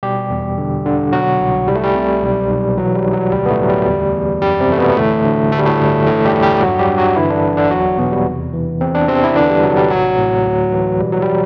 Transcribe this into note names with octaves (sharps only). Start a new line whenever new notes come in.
B2 G3 G4
E2
D3
D3
B2 F#3 F#4
C2
C2 G3
A3
G3
C3
B1
B1
E3 F#3
G3
B1
F#3
D2 G3
B3
A2 A3
D2 F#3
G3
E2
E2
F#2 G3
C3 C4
E3 A3
B2 B3
B3
D2 A2 A3
D2
D3 A3
G3
A2 A3
G1
A2 E3 A3
G3 G4
E2
G3 G4
G2 F#3 F#4
G3 G4
G2
F#3 F#4
D3 E3 E4
D3 D4
G1
D3 D4
E2 F#3 F#4
E2 B2 B3
G3
C3
E3
E2 C4
D4
E2 C3 C4
E4
D3 E3 D4
G3
C3 F#3
G3
A1 F#3
A2
D2
E3
B2 G3
F#3
G3